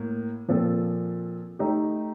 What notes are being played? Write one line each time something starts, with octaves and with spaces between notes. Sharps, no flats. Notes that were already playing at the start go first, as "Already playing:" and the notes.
Already playing: A2 A#3
A#2 F3 C4 F4 A4
A3 D#4 G4